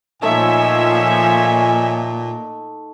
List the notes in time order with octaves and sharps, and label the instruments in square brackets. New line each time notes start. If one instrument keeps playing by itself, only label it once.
[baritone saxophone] A#2 [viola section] F3 C#5 E5 [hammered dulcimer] A3 D#4 [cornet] G#5